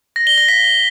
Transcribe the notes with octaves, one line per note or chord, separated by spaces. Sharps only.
A#6
G7
A#6
B6